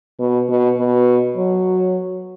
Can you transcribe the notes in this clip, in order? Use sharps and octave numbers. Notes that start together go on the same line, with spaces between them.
B2
B2
B2
F#3